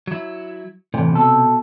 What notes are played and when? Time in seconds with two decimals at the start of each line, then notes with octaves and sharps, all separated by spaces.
0.07 F#3 E4
0.94 A2 C3 E3
1.12 B2 A4